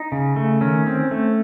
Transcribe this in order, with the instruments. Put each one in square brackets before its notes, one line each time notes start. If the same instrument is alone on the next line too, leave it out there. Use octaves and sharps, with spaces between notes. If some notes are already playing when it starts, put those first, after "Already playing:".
Already playing: [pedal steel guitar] D#4
C#3
A3
D#3 C#4
C4
A3